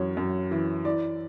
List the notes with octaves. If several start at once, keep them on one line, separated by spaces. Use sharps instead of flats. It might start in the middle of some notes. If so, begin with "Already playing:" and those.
Already playing: F#2 E3 C#5
F#2
E3
E3 D5